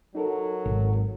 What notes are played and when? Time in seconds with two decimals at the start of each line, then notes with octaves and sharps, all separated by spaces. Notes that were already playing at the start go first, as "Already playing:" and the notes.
0.15 F#3 D#4 A4 A#4
0.65 G#1